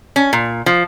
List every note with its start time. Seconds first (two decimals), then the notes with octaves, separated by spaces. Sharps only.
0.16 C#4
0.33 A#2
0.66 F3